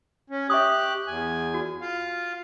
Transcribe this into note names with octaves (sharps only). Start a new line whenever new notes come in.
C#4
G4 E5 C#6 D#6 F#6
E2 G#5
F#4
F4 F5